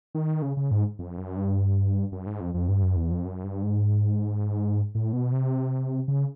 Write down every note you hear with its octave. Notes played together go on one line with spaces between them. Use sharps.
D#3
C#3
C#3
G#2
F2
F#2
G2
F#2
G#2
F2
F2
G2
F#2
E2
F2
F#2
G2
G#2
A2
B2
C3
C#3